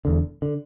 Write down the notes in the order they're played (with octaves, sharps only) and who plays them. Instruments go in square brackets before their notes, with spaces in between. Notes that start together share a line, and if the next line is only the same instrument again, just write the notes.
[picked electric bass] E1 E2 D3
D3